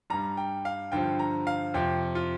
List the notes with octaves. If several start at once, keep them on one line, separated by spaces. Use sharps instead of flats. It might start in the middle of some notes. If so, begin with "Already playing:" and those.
G2 G3 A#5
G5
F5
G2 D3 F3 G5
A#5
F5
F2 C3 F3 G5
F4